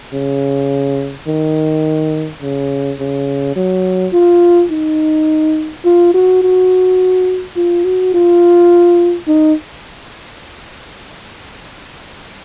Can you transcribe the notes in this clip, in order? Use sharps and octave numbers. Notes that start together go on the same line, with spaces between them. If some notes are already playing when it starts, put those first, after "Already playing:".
C#3
D#3
C#3
C#3
F#3
F4
D#4
F4
F#4
F#4
F4
F#4
F4
D#4